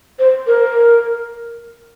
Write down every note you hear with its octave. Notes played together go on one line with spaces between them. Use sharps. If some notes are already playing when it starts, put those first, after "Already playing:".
C5
A#4